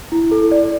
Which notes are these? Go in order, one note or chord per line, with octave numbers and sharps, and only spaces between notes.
E4
A4
D5